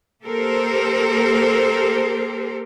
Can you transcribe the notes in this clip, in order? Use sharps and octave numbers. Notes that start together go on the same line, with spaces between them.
A#3 G4 A4 A#4 C5